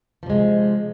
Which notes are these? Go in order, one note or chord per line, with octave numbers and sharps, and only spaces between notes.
C3 F3 G#3